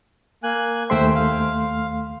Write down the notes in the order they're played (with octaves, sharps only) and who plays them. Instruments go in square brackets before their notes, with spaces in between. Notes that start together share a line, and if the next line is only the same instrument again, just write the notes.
[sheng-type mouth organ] A#3 G#5 F#6
[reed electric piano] D#2 A3 C6 [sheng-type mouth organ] C5 E5 G5
[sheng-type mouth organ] F5